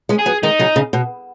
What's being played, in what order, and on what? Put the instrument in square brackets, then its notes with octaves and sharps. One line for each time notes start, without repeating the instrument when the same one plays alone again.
[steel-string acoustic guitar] G#3 C#4
[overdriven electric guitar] G#4
[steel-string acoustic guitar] F#3 B3
[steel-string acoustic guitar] D#3 G#3 [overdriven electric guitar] D#4
[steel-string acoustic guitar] C#3 F#3
C#3
B2